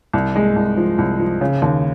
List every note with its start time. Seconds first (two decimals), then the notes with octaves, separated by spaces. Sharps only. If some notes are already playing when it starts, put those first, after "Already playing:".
0.13 C2
0.36 G#3
0.56 C2
0.77 F3
0.98 C2
1.20 F3
1.41 C#3
1.62 D#2